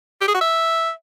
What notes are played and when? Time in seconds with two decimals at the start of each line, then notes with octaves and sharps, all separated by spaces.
0.21 G4
0.28 G#4
0.35 F#4
0.41 E5